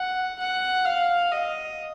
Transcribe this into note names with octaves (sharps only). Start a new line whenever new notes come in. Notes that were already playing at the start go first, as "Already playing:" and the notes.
Already playing: F#5
F#5
F5
D#5